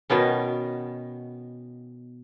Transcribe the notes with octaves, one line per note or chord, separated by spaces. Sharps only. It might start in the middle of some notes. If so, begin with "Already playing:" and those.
B2 D#3 B3 C#4